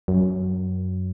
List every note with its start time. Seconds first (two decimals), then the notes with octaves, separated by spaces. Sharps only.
0.08 F#2